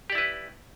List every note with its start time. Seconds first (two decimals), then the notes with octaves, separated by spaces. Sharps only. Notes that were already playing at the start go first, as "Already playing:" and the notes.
0.10 G4
0.12 D5
0.15 E4
0.18 B4